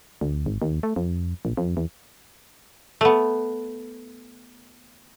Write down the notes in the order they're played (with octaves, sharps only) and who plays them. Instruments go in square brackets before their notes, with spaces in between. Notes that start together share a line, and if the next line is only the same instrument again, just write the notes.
[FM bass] D2
G#1
D#2
A3
F2
A#1
F2
E2
[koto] A3 B3